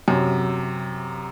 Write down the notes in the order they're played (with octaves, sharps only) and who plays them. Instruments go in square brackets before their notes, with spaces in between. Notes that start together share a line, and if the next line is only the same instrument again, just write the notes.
[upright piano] F#2 C3